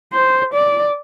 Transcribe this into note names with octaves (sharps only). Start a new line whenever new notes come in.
C5
D5